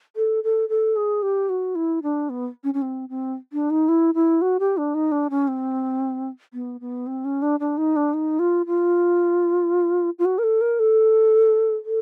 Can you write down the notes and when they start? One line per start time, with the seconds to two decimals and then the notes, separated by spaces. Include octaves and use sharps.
0.16 A4
0.44 A4
0.69 A4
0.96 G#4
1.23 G4
1.49 F#4
1.75 E4
2.03 D4
2.30 B3
2.64 C#4
2.74 C#4
2.82 C4
3.09 C4
3.53 D4
3.70 D#4
3.89 E4
4.15 E4
4.42 F#4
4.60 G4
4.77 D4
4.94 D#4
5.12 D4
5.30 C#4
5.48 C4
6.54 B3
6.81 B3
7.07 C4
7.25 C#4
7.42 D4
7.60 D4
7.78 D#4
7.96 D4
8.14 D#4
8.39 F4
8.67 F4
10.19 F4
10.25 F#4
10.38 A#4
10.43 A4
10.61 A#4
10.79 A4
11.85 A4